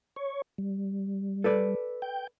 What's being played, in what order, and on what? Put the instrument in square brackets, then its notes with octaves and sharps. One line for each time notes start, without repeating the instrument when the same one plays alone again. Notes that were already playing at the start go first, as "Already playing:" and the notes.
[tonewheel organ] C#5 C#6
G3
[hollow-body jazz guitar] A4 B4 D5
[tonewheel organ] G5 G6